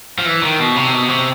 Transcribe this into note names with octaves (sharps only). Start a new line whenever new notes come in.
F3
E3
D#3
B2
C3
B2
C3